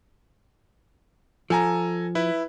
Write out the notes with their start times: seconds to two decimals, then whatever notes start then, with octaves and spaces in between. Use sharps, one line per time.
1.50 F3 A4 G#5 A#5
2.15 E4 B4